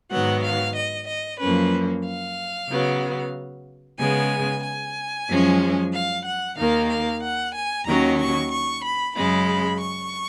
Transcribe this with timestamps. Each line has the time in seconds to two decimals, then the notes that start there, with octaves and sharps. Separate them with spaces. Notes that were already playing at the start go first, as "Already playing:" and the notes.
0.11 G#2 D#3 F#3 B3 F#5
0.44 F5
0.76 D#5
1.08 D#5
1.40 F#2 F3 A#3 C#4 B4
2.05 F5
2.70 C#3 F#3 B3
3.99 C#3 G#3 B3 G#5
4.63 G#5
5.28 F#2 F3 G#3 C#4
5.93 F5
6.25 F#5
6.57 D#2 D#3 A#3 F5
6.90 F5
7.23 F#5
7.55 G#5
7.87 D#2 D#3 F#3 C#4 A#5
8.19 C#6
8.51 C#6
8.84 B5
9.16 F#2 C#3 G#3 B5
9.81 C#6